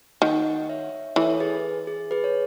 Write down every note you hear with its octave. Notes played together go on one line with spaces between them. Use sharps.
D#3 D#5 F#5
C#5 E5
E3 A4 C#5
G#4 B4
G#4
G#4 B4
C#5